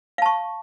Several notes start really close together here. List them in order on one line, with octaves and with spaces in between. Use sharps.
F5 A5 C#6